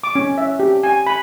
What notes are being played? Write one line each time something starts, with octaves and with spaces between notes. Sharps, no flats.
D6
C#4
E5
G4
G#5
B5